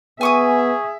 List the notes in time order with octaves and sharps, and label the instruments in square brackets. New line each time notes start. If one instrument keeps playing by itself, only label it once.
[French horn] B3 [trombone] G#4 [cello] E5 [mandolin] G#5 C#6 D#6